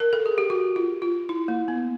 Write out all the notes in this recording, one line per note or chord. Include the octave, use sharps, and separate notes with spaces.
A#4
A4
G#4
G4
F#4
F4
F4
E4
A#3
B3